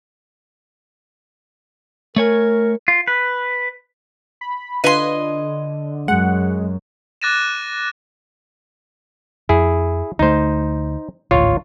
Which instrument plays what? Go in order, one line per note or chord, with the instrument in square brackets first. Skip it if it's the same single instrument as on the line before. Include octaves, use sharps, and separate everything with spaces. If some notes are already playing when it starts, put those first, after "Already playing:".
[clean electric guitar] A3 C#5 G#5 [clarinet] A#4
[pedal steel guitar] F4
B4
[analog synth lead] B5
[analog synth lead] D3 [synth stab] F4 B4 G#6 [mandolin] D#5 C6
[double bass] F#2 F#3 [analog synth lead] G#3 [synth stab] F#5
[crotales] D6 F#6 A6 A#6 D#7 E7
[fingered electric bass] F2 [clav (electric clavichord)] E4 G#4
[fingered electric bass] D2 F#3 A3 [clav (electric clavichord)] D#4 C5
[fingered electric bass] G#1 D2 A2 [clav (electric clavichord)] F4 C#5